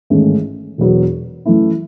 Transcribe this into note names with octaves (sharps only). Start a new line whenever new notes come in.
A1 G#2 D#3 A3 C#4
E1 E2 B2 F#3 B3
F#2 E3 A3 E4